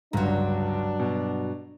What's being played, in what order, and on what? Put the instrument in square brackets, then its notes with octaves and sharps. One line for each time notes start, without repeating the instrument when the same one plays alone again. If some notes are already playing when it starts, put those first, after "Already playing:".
[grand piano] G1 C#2 A#5 [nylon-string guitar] G2 F#3 [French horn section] D4
[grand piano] B2